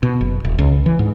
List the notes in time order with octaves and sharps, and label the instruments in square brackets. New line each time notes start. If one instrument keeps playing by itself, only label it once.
[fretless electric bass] B2
F#1
D#1
C#2
E3
G#2